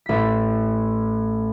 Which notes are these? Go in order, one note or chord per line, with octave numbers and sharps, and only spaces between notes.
A1 B6